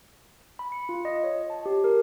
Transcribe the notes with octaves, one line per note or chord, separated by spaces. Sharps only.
B5
C#7
F4
D#5
C#5
A5
G4
A#4